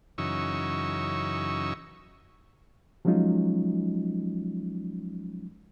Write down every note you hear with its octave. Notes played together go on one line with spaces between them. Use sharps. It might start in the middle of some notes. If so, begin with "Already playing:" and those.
F#2 C#3 E3 D#4 C#6 E6
F3 F#3 G#3 C#4 D#4 F4